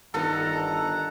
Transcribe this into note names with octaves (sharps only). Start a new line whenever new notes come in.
G1 D3 D#3 D#4 A4 F#5 A#5